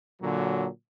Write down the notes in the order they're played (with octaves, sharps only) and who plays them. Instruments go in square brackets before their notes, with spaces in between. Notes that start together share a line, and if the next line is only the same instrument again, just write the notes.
[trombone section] A#2 D3 F#3